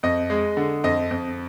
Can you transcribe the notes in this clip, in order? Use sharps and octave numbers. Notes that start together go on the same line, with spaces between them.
F2 D#5
G#3
D3
F2 D#5
F2